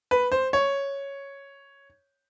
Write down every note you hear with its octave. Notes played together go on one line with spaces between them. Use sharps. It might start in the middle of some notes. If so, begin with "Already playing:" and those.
B4
C5
C#5